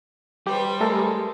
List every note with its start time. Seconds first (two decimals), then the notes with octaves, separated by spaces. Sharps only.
0.47 G3 G4 B4 C5
0.81 G#3 A3 A4 A#4